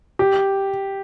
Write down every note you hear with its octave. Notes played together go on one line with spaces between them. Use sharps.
G4